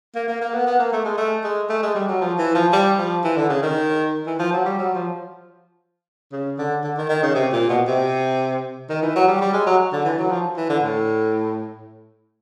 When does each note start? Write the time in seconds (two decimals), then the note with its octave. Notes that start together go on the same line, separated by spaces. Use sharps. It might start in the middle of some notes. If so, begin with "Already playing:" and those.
0.15 A#3
0.28 A#3
0.41 A#3
0.53 B3
0.67 B3
0.79 A#3
0.92 A3
1.05 G#3
1.18 A3
1.44 G#3
1.69 A3
1.82 G#3
1.95 G3
2.08 F#3
2.21 F3
2.38 E3
2.55 F3
2.73 G3
2.98 F3
3.24 E3
3.36 D3
3.50 C#3
3.62 D#3
4.26 E3
4.39 F3
4.52 F#3
4.65 G3
4.78 F#3
4.95 F3
6.32 C#3
6.58 D3
6.83 D3
6.97 D#3
7.09 D#3
7.22 C#3
7.35 C3
7.52 A#2
7.69 B2
7.87 C3
8.89 D#3
9.03 E3
9.15 F#3
9.28 G3
9.41 G3
9.53 G#3
9.67 F#3
9.92 D3
10.05 E3
10.18 F#3
10.31 F3
10.57 E3
10.69 D3
10.83 A2